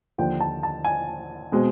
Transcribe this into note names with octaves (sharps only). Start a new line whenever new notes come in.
D#2 D3 F3 G5
A5
A5
G#5
B2 G#3 C4